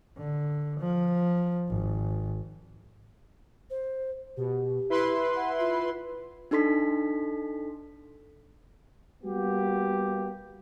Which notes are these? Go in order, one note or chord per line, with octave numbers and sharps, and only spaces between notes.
D3
F3
G#1
C5
B2 G4
E4 B4 C6
F#5
F4
D4 D#4 A4 C6 B6
G3 A#3 B3 F#4 G4